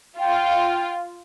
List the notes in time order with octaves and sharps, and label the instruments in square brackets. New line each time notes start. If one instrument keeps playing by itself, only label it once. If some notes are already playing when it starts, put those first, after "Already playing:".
[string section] F4 [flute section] G5